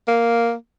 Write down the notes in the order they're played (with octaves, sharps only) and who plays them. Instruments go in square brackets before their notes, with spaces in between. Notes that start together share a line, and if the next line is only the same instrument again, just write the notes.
[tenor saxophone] A#3